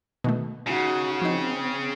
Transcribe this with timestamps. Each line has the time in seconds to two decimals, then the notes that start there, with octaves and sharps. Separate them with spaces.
0.24 B2 D#3 A3
0.67 C#3 D#4 F#4
1.22 F3 C4 D#4